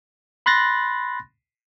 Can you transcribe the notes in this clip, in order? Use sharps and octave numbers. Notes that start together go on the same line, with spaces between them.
B5 C6 F#6 A6 A#6